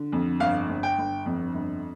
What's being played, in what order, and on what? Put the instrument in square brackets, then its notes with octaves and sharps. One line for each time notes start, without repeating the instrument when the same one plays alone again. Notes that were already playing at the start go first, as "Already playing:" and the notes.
Already playing: [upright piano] D3
F2
G1 F5
G1
G5
G1
F2
G1